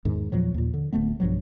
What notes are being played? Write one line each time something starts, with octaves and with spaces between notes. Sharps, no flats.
E2 G#2 D#3
E2 A#2 F3 F#3
D#2 A#2
D3
D1 D2 A3 B3
B1 G2 F3 F#3